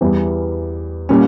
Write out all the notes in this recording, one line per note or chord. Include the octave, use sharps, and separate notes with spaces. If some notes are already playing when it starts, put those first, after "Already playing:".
E2 E3 G3
A#2 G3 C#4